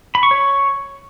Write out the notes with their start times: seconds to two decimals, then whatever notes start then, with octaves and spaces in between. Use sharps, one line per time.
0.15 B5
0.23 C#6
0.31 C#5